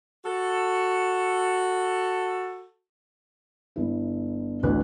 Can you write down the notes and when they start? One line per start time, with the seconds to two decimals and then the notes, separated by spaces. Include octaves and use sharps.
0.24 F#4 A4
3.76 G1 E4
4.63 A1 D2 B4 F#6